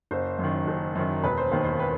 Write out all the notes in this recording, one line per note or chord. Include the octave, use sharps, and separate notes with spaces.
F#1 C5
F#2 D#3
F#1
F#2 D#3
E1 B4
C5
D#2 D#3 C5
C5
B4